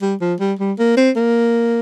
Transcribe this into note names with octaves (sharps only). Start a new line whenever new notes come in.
G3
F3
G3
G3
A#3
C4
A#3